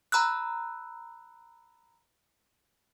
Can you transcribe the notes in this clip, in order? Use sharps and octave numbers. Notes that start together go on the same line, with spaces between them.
A#5 B5 E6 F#6